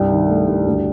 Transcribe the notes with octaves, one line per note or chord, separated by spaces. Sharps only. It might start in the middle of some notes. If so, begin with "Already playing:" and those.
Already playing: C2 G2 G5
D#3
A3
G2
D2